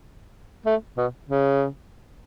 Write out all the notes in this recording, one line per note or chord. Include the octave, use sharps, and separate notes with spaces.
A3
B2
C#3